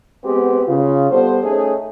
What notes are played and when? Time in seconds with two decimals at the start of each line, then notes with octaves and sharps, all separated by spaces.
0.23 G#3 B3 C4 F#4 G4 B4
0.67 C#3 F4
1.10 G3 B3 A4 C5
1.43 A3 C#4 D#4 G#4